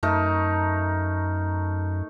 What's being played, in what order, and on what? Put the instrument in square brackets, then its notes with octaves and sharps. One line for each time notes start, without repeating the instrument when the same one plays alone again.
[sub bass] F#2 [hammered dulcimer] A3 D#4 A#4